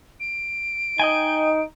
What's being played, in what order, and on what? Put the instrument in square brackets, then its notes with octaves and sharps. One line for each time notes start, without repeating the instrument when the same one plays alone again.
[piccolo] D7
[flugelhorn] D#4 [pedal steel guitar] D#5 G5 G#5